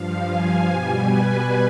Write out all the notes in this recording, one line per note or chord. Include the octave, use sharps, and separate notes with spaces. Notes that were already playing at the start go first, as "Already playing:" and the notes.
Already playing: G2 F3 F5
G#5
B2 G3 G#5
B4